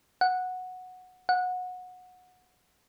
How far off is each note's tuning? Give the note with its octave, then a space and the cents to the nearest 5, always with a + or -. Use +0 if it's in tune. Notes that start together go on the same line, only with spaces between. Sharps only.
F#5 -10
F#5 -20